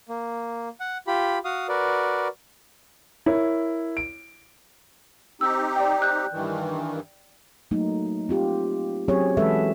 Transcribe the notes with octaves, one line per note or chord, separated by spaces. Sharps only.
A#3
F#5
F4 G4 B5
F#4 F5 D#6
F#4 A#4 B4 D5
E4 A#4 C#5
D7
C4 D#4 G4 E6
D5 G5
F#6 G6
G2 D#3 E3
F#3 A3 A#3 D#4
C4 F4 G4
F#3 C4 C#4 G4 G#4 C#5
E3 G#3 F#4 A4 B4 E5